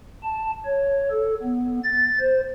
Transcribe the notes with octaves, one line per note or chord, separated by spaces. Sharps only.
A5
C#5
A4
B3
A6
C5